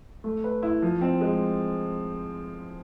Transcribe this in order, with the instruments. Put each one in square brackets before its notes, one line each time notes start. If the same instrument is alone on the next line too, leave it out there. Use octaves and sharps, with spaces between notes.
[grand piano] A3
B4
E4
F3
C4
G#3